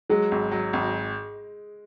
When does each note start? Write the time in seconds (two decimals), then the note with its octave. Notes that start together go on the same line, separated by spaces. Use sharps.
0.10 F#3 G#3
0.32 G#1
0.52 F#3
0.73 G#1